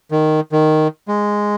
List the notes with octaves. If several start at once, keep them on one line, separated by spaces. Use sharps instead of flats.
D#3
D#3
G#3